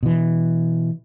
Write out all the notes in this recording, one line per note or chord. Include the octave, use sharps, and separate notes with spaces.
B2 E3